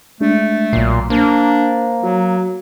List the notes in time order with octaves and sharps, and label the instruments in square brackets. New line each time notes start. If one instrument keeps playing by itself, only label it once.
[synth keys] G#3 D4 [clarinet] A3
[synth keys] B1 F#3 C7 [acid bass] A#2
[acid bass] A#3 [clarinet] D4 [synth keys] C5
[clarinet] F#3 [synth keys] F#4